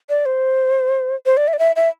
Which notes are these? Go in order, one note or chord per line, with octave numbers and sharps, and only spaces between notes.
D5
C5
C5
D5
E5
D5
E5
E5